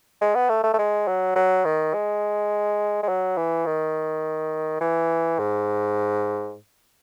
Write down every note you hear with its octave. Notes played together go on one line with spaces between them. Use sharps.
G#3
B3
A3
A3
A3
G#3
F#3
F#3
D#3
G#3
G#3
F#3
E3
D#3
E3
G#2